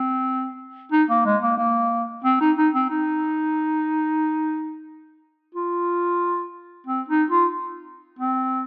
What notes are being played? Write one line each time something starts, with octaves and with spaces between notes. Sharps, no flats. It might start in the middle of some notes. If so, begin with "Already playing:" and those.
Already playing: C4
D#4
A#3
G#3
A#3
A#3
C4
D#4
D#4
C4
D#4
F4
C4
D#4
F4
C4